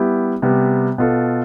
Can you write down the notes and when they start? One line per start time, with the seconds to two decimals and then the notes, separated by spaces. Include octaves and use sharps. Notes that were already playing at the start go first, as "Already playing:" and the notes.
Already playing: G3 B3 E4 G4
0.42 C3 G3 B3
0.98 B2 B3 F4 A4